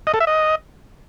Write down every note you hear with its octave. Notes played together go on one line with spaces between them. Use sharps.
D#5
A4
E5
D#5